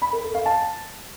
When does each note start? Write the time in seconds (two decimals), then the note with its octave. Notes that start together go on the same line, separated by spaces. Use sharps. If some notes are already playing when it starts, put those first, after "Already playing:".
0.02 B5
0.13 A#4
0.24 A4
0.35 F5
0.46 A5